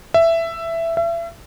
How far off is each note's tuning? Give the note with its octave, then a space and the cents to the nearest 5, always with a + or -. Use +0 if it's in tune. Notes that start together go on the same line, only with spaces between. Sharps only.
E5 +10
E5 +35